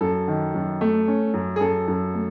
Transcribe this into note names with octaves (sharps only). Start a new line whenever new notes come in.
F#2 A4
D#3
F#2
A3
C#4
F#2
G#4
F#2 A4
F#2
A3